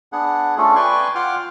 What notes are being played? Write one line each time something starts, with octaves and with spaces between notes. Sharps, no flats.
B3 D4 G#4 F#5
A3 C#4 D4 F4 G#4 A4
B4 D5 G5 G#5 C6 C#6
F4 F#5 G5 C6 D6 F6